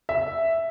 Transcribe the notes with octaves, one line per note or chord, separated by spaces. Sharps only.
E5